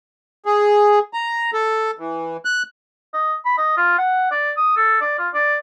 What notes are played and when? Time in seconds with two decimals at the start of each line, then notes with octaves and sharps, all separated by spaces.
0.45 G#4
1.13 A#5
1.53 A4
1.99 E3
2.45 F#6
3.14 D#5
3.45 B5
3.58 D#5
3.77 F4
3.99 F#5
4.31 D5
4.57 D#6
4.77 A4
5.02 D5
5.19 F4
5.34 D5